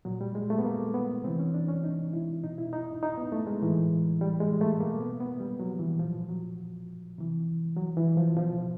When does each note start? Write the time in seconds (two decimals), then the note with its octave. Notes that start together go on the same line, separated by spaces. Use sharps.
0.05 A#2 F#3
0.21 G3
0.35 G#3
0.50 A3
0.59 B3
0.65 A#3
0.94 B3
1.24 C3 E3 C4
1.39 C#4
1.54 D4
1.69 C#4
1.83 D#4
2.13 E4
2.43 B2 D#4
2.58 E4
2.73 D#4
3.03 D#4
3.18 B3
3.32 A3
3.47 G#3
3.62 A2 E3
4.21 G3
4.40 G#3
4.61 A3
4.80 B2 A#3
5.01 B3
5.20 B3
5.40 G3
5.60 F#3
5.73 F3
5.79 E3
5.99 A#2 F3
6.29 F#3
7.18 C3 E3
7.77 F#3
7.97 E3
8.17 F3
8.37 B2 F3